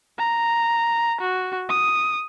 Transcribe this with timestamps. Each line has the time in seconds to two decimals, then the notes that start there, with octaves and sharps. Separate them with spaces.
0.19 A#5
1.21 F#4
1.69 D#6